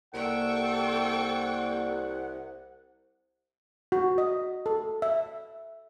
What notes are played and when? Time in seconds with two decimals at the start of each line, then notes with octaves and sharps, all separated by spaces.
0.14 C2 A#3 A4 D5 F#5 G5 C#6
3.92 F#4
4.18 D#5
4.66 A4
5.02 E5